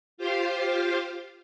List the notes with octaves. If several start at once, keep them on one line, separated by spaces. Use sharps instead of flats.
F4 G4 C5 F5